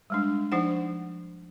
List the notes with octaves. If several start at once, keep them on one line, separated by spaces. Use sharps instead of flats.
G3 G#3 D4
F3 D4 D#4 C5 F#5